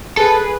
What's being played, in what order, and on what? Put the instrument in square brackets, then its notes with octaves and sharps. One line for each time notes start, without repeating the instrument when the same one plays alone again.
[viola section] G#4 B4 [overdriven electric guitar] A4